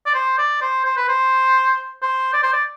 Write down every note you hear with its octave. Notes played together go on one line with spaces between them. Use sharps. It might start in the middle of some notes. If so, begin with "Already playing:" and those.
D5
C5
D5
C5
C5
B4
C5
C5
D5
C5
D5